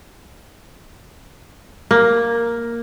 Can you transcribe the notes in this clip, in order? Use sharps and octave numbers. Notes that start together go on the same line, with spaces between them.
A#3